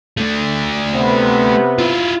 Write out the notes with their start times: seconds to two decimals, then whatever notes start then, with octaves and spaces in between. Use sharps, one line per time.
0.17 A3 D4
0.95 C3 B3
1.79 E4 F4